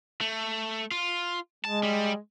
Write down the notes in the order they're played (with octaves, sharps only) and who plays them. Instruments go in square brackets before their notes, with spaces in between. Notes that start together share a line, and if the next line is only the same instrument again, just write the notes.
[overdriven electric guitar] A3
F4
[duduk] G#3 [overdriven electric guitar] A5
[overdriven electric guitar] G3